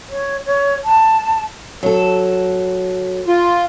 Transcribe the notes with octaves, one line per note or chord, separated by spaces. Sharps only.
C#5
C#5
A5
F#3 A4
F4